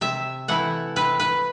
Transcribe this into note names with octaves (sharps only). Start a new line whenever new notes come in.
C3 E5
E3 A3 E4 F#5
C3 B4
B4